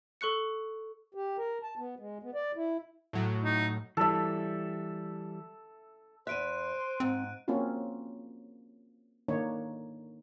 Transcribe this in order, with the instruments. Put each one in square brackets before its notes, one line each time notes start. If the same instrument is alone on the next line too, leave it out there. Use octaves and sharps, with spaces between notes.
[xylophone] A4 C#6 F#6 C#7
[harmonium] G4
A#4
A5
B3
G#3
B3
D5
E4
[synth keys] A2 F#3
[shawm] D#4
[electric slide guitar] E3 G3 [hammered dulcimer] A4 E5
[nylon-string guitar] E2 E5 [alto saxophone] C5 [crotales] F#6 D7 D#7
[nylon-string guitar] G#2 [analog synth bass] C4
[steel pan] A#3 C4 C#4 F4 F#4
D#3 A#3 D4 D#4 C#5